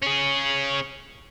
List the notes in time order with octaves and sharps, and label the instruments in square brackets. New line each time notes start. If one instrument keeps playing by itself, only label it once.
[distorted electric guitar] C#4 G#4